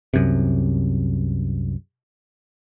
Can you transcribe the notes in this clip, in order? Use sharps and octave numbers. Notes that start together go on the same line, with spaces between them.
C2 F#2 C3